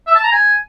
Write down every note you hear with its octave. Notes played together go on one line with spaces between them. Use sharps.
E5
A5
A#5
G#5